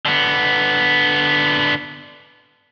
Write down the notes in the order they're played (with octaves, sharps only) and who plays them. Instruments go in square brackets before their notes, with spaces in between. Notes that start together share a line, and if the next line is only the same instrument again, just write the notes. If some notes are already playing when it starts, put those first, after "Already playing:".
[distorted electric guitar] D3 B3